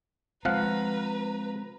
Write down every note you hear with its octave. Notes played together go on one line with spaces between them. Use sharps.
F3 G#3 C4 B4 F5 F#5 A#5